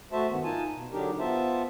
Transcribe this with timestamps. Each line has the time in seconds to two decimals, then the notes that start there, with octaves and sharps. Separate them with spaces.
0.12 A3 F#4 C5 E5 A5
0.29 G2 D#3 B3
0.44 D#4 F4 G#5 A5
0.74 B2
0.92 D3 F#3 D4 D#4 G4 A#4
1.19 B3 F4 C5 E5 A5